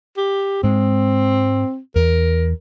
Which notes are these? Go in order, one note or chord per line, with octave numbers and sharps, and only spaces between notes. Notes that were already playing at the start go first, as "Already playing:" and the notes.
G4
G#2 G#3 C4
E2 A#4